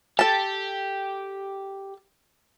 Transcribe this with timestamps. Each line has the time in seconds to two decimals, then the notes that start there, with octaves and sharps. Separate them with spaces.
0.19 G4 A4 A5